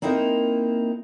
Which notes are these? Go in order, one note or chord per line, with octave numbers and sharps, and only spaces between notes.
A#3 C4 D#4 E4 A#4